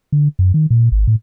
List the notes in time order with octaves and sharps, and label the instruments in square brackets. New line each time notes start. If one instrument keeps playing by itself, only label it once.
[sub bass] D3
F#2
D#3
A#2
G#1
A2